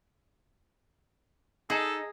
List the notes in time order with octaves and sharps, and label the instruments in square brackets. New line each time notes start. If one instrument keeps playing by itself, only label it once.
[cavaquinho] D#4 [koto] G#4 [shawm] A4